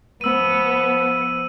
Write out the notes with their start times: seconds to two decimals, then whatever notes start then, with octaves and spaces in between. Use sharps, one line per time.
0.21 F3 B3 E6 D#7